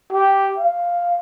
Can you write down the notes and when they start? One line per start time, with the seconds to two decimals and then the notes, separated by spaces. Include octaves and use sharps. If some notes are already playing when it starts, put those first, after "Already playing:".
0.13 G4
0.58 F5